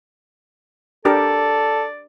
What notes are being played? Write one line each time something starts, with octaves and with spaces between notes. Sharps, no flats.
D4 G4 A4 A#4 D5